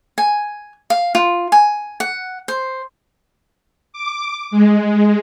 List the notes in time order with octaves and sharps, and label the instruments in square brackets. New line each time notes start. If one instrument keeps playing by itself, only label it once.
[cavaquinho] G#5
F5
F4
G#5
F#5
C5
[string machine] D6
G#3